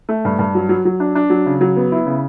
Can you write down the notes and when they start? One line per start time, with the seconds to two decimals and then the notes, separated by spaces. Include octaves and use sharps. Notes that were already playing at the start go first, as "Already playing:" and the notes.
0.09 A3
0.25 G2
0.39 G2
0.55 F#3
0.69 F#3
0.85 F#3
1.00 D4
1.15 D4
1.30 F#3
1.46 C#3
1.61 F#3
1.77 B3
1.92 E4
2.06 C#3